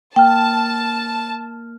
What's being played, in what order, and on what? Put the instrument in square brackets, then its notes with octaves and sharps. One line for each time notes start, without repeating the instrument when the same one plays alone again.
[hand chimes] A#3 F6 [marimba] G5 [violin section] A5